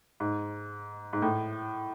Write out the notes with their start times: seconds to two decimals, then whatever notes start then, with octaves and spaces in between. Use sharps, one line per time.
0.20 G#2
1.13 G#2
1.22 A2